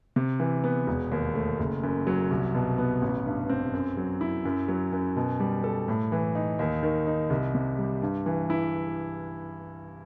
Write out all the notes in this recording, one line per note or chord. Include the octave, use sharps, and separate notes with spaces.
C3
E3
B3
E1
D#2
A3
F#1
F#2
F#3
C2
B2
B3
A1
G2
C4
F#2
F#3
E4
F#2
F#3
F#2
B2
G3
A4
A2
E3
D#4
D#2
D#3
D#4
C2
C3
G3
G2
E3
E4